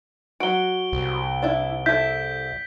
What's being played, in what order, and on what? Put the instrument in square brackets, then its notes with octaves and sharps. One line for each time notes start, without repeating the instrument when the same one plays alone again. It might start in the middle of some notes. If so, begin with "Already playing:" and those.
[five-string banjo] F#3 F#4 [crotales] D7 G7
[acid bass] C2
[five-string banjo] D4 E4
[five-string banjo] E4 A4 [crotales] G6 B6